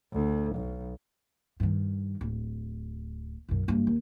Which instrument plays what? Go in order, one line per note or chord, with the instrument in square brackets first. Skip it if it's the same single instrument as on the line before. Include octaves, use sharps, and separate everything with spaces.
[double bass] D2
B1
[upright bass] G2 D#3
D1
B1 F#2
F#1 G2
D#2